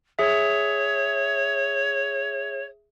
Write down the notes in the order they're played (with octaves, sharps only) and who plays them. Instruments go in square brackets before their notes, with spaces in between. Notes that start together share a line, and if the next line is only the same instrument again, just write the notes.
[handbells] G#4 E5 [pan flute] C#5